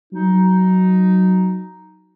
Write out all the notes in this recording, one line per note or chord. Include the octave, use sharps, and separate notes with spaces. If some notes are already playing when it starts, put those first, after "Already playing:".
F#3 D#4